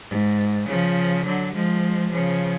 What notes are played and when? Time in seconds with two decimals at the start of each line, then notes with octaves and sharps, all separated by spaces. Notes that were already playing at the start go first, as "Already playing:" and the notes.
0.10 G#2
0.68 C#3 F3
1.25 D3 F#3
1.54 F3 G#3
2.12 C#3 F3